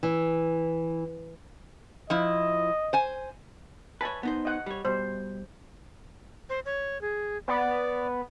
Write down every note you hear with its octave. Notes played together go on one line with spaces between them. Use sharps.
E3
F3 E4 D#5
C5 G#5
B4 C#5 G#5 A5 B5
B3 D#4 C5
D#5 F#5
G3 C#5
B2 G3 C5
C5
C#5
G#4
B3 D5